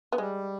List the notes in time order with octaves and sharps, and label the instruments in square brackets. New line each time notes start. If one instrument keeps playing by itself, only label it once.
[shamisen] B3
[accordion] G3 [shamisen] G#3